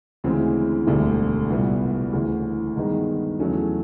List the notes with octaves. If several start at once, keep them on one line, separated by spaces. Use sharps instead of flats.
D2 C#3 E3 G#3 C4
E1 D2 D3 G3
C2 A#2 G3 B3
D2 C#3 E3
G2 D#3 G#3 B3 D#4
E2 C#3 F#3 A3 C#4